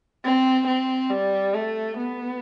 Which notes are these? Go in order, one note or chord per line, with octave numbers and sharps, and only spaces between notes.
C4
C4
G3
A3
B3